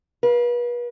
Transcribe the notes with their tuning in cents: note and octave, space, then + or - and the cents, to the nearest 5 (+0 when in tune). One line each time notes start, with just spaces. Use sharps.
B4 -40 F5 +0